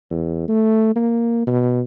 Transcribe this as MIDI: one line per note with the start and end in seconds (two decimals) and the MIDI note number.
0.11 0.47 40
0.48 0.93 57
0.96 1.42 58
1.47 1.82 47